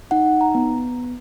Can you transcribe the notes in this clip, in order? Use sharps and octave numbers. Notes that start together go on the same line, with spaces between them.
D#4 F#5
A#5
B3